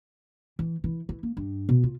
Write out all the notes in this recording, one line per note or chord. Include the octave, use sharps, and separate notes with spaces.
E3
E3
E3
A#3
G2
B2
F4